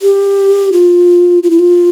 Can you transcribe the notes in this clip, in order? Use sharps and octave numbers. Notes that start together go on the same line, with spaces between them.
G4
F4
F4
E4
F4